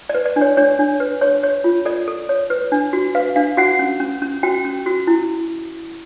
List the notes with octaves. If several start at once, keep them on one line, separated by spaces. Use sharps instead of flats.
D5
B4
D5
D4
C#5
D4 C#5
D4
B4
C#5
C#5
F4
A4 D5
A4
C#5
B4
D4
F#4
B4 F5
D4 F5
F#4 F#5
C#4
C#4
C#4
F#4 G5
C#4
F#4
E4